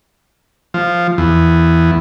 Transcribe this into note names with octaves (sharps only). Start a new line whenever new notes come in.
F3
E2